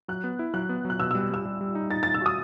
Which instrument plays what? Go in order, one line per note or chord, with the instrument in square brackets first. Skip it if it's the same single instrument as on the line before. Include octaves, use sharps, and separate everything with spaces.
[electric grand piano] F#3 [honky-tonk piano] F#6
[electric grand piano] B3
E4
[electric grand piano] F#3 [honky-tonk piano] F#6
[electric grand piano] B3
F#3
[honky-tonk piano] F#6
[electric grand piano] B2 [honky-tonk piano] E6
[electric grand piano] G3 [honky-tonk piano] E6
[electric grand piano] G3 [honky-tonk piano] E6
[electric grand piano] G3
G3
D#4
[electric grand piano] D#4 [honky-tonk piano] A6
[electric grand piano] G3 [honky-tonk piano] A6
[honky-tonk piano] E6
[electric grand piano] F#4 [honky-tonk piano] D#6